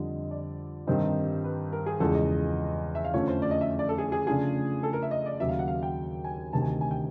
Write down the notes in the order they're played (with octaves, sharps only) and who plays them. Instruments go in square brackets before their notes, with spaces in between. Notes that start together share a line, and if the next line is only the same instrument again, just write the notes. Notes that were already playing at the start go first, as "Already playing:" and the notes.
Already playing: [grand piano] F2 D3 G3 [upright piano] D#5
[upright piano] D5
[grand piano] G2 D#3 G3 C4 D#4 [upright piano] C5
[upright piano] B4
A#4
G#4
[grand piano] E2 C#3 F3 G#3 [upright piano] A4
[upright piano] D#5
E5
F5
[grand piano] F2 D3 F3 A3 C#4 [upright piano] C#5
[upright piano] C5
D5
D#5
E5
D5
A4
G#4
G#4
[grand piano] C#3 F3 A3 D4 F4 [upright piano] G#4
[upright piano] A4
A#4
E5
D#5
D5
[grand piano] D#2 C#3 F#3 A#3 [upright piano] E5
[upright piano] F5
F#5
F5
G5
G#5
[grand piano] D2 C3 D#3 [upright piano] A5
[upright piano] G#5
G#5
G5